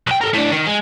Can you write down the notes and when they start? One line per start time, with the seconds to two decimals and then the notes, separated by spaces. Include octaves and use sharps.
0.07 B1 G5
0.21 A4 A#4
0.34 A2 D4
0.51 D#3
0.66 G#3